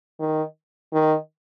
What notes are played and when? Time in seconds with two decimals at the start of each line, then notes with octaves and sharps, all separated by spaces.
0.20 D#3
0.93 D#3